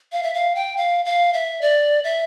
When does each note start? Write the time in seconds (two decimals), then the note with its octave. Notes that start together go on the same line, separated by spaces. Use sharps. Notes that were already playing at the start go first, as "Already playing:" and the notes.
0.12 F5
0.23 E5
0.34 F5
0.55 G5
0.77 F5
1.05 F5
1.33 E5
1.62 D5
2.04 E5